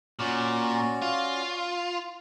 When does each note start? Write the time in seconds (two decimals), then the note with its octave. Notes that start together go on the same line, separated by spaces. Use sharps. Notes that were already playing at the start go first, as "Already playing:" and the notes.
0.20 A#2 C#4 F#4 D5
1.02 F4